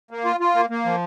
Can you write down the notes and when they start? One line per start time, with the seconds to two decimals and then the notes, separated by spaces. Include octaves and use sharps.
0.11 A#3
0.25 F4
0.40 F4
0.55 A#3
0.70 A#3
0.85 F3